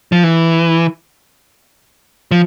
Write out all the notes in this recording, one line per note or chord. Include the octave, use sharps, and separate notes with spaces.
F3
E3
F3